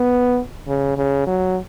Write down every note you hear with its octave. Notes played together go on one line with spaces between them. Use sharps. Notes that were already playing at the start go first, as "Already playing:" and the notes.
Already playing: B3
C#3
C#3
F#3